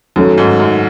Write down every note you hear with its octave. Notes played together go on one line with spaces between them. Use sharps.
F#2 D#3 F#3 A3 C#4 F#4
G#2
F#2